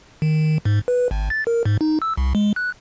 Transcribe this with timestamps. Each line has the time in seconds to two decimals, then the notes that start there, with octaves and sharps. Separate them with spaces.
0.22 D#3
0.65 G#2
0.88 B4
1.11 G#1
1.30 A6
1.47 A#4
1.66 G#2
1.81 D#4
2.02 E6
2.17 C2
2.35 G#3
2.56 F#6